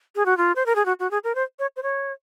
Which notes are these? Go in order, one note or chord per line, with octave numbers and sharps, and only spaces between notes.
G#4
F#4
F4
C5
A#4
G#4
F#4
F#4
G#4
A#4
C5
C#5
C5
C#5